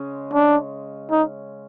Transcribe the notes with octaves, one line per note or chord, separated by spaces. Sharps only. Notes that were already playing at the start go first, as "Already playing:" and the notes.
Already playing: C#3 G#3 C#4
D4
D#4